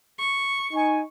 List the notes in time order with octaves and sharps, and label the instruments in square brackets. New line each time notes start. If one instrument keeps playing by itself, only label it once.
[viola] C#6
[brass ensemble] D#4 G#5